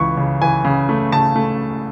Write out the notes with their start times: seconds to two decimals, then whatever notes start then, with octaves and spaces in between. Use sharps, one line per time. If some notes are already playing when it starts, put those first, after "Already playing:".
Already playing: C#2 E3 C#6
0.17 C#3
0.42 E3 G#5
0.64 C#3
0.89 A3
1.12 C#3 A5
1.36 A3